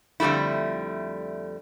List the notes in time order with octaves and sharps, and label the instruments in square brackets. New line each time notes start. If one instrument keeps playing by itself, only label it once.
[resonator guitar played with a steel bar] F2 D3 G3 A3 E4